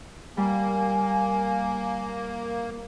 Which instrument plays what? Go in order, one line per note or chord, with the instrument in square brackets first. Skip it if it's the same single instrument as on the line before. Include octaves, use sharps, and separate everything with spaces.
[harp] G3 [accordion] A#3 [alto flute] G#5